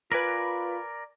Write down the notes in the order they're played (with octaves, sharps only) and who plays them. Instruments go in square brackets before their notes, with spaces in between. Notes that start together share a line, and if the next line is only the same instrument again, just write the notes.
[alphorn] F4 [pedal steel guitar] A#4 D5 G#5 [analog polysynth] B4 B5